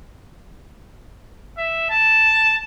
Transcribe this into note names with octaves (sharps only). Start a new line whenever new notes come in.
E5
A5